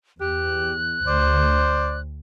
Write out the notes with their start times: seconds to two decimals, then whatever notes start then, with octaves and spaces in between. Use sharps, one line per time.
0.20 E2 G4 F#6
1.07 D2 C5 D5